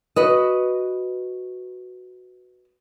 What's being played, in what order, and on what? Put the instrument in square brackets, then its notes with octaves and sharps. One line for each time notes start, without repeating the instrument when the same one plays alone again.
[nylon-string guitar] F#4 B4 D#5